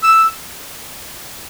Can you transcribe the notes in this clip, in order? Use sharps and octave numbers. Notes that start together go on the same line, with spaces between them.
E6